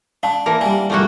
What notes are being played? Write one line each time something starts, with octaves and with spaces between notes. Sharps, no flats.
D4 F5 A5 B5
E3 A#3 A#4 A5
G3 D4 G#5
C2 F2 A3 A#3 F#4